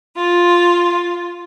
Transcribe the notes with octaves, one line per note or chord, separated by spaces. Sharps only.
F4